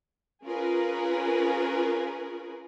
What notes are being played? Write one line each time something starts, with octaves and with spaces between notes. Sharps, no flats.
C#4 F4 G#4 A#4 B4